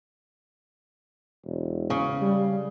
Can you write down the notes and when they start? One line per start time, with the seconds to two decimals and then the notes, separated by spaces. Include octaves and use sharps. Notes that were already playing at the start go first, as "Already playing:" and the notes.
1.44 E1
1.90 C#3
2.21 G3